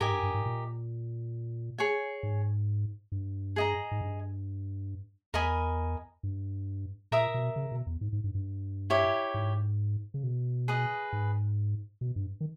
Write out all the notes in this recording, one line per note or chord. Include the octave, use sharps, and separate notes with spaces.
G#2 G4 A#4 D#5 G#5
G2
G2
G#2
A#2
G#4 C#5 G#5
G#2
G2
G#4 D#5 A#5
G#2
G2
E2 A#4 D#5 G#5 B5
G2
A#2 A#4 E5 A#5 D#6
B2
C#3
B2
E2
G#2
G#2
G2
G2
E4 G4 C#5
G#2
C#3
B2
G#4 B4 D#5
G#2
B2
G2
D#3